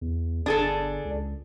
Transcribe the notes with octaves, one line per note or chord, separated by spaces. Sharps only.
E2
G1 D4 G#4 A4
C#2